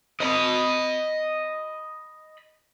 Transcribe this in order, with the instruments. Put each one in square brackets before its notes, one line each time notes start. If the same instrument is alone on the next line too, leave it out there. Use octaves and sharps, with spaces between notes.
[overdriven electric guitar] D#5 B5